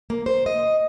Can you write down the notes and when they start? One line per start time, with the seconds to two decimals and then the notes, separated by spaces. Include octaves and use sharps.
0.10 A#3
0.26 C5
0.46 D#5